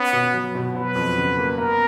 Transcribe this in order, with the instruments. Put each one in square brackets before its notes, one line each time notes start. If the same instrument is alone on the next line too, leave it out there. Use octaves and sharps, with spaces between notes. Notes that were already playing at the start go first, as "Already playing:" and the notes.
Already playing: [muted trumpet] B3 [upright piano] C#4
[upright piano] B2
F#3
B2
[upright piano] F#3 [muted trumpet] B4
[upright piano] F2
C#3
A#3
[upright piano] B3 [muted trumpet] A#4